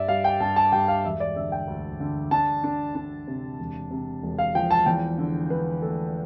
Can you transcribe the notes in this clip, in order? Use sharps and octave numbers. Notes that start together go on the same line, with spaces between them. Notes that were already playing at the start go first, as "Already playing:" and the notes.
Already playing: G2 D5 E5
G3 F5
G5
G2 A5
A5
G2 G5
F5
E1 E5
D5
D3 E5
G5
D2
D3
D4 A5
D4
D4
C3
E1
C3
E1
F5
F3 G5
A5
E2 G5
D3
D3 B4
A3 A4